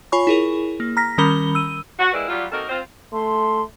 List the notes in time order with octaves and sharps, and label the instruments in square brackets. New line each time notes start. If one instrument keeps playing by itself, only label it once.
[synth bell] F4 C#5 G#5 B5 C#6
E4 G#4 A#4
A#3
A#5 F6 A#6 B6
D#3 G3 C#4 A#4 B5 G7
E6 D#7
[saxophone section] F#4
G3 G#3 A#3 E4 B4 D5
F#3 G3 F4
A#3 C4 D#4 F#4 A4 A#4
C4 F4 C5
[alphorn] A3 [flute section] C6